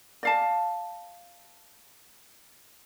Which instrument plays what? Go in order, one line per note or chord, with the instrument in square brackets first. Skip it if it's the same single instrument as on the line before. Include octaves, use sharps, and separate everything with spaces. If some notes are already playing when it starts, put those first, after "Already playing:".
[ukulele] D5 F5 A5